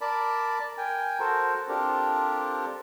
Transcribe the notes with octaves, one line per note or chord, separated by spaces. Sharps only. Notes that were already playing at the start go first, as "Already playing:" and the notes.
A#4 D5 A5 B5
A#4 G5 G#5
F#4 A4 A#4 C5
C4 D4 F4 G4 A4 A#4